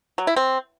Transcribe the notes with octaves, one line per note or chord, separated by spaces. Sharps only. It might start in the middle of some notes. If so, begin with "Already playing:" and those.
F#3
E4
C4